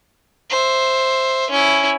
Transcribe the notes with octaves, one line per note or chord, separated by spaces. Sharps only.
C5 E5
C#4 E4